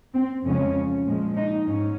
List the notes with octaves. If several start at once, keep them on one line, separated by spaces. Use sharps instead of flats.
C4
F2 C#3 F3 G#3 C#4
A#2 F3 G#3
D#4
G#2 C#4